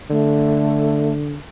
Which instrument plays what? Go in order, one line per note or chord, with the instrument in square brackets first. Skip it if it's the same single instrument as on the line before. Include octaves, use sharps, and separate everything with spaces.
[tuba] D3 [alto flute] A3